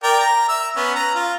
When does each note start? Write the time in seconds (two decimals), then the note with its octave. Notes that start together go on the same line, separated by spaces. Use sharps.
0.03 A#4 D5 G5
0.21 A#5
0.49 E5 E6
0.76 B3 C#4
0.96 A#5
1.15 F4